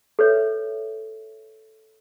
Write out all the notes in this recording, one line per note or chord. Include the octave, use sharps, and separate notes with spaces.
A4 B4 C#5 E5